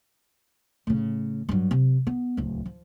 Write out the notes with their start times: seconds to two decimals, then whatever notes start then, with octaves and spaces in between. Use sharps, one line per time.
0.87 A2 C#3
1.49 G2 F#3
1.71 C3
2.07 B3
2.37 D1 C#2
2.66 F3